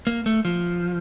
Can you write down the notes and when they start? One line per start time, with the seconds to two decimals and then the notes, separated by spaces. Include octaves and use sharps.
0.07 A#3
0.26 A3
0.45 F3